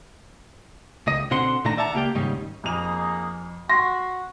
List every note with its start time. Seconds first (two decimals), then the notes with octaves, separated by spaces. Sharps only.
1.07 C#2 D#5
1.31 B2 D3 C4 F#5 C6
1.65 A#2 D#3 A3 D4 A#5
1.77 D5 E5 F#5 A5 A#5
1.94 C#2 A#3 G4 G5
2.15 D#2 G#2 C#3 G3 D#4
2.64 F2 A#3 D#4 G#4 F7
3.69 F#4 C6 A#6